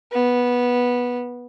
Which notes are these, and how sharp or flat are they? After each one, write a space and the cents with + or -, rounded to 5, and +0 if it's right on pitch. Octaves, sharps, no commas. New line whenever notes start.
B3 -10